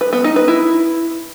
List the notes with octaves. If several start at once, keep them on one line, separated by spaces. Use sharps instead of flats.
B4
B3
D#4
B4
E4